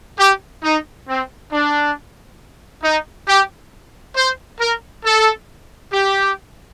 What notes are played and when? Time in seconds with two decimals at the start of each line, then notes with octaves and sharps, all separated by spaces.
0.20 G4
0.64 D#4
1.09 C4
1.53 D4
2.84 D#4
3.28 G4
4.17 C5
4.60 A#4
5.05 A4
5.93 G4